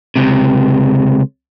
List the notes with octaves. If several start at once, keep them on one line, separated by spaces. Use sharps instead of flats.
C#2 C3